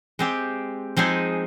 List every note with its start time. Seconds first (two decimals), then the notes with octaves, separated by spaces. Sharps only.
0.19 G#3 C4 G4
0.97 F3 G#3 C4 D#4 G#4